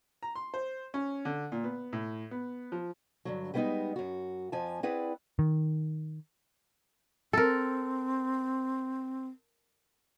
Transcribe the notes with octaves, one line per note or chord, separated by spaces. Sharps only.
A#5
C6
C5
C#4
D3
A#2
B3
A2
B3
F3
G2 D3 F#3
G3 G#3 B3 D4 D#4 D#5
F#2 F#4
F2 F3 G#5 A5
C4 E4 G#4 B4 D5 F#5
D#3
C4 A4 A#4